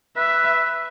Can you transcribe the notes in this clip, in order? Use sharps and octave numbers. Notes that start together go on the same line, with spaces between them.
B4 E5